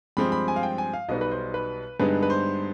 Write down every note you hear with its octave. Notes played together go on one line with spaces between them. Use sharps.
G2 F3 G#3 C4 B5
B5
G#5
F5
G5
G#5
F5
B1 B2 G3 B3 D#4 D#5
B4
C5
B4
G2 D3 G#3 B3 D#4 B4
B4
C5